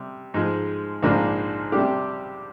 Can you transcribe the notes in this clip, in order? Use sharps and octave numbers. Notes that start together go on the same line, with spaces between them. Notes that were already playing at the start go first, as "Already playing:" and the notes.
Already playing: C3 G3
G#2 F3 G#3
A#1 G#2 F3 A#3 D4
C3 G3 D4 G4